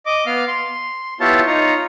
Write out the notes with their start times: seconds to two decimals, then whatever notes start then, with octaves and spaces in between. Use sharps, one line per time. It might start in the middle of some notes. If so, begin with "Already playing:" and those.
0.06 D#5 D6
0.26 B3 F5 F6
0.48 C6
1.20 B3 E4 F4 G4 C#5 A5
1.47 D#4 F4 C#5 A#5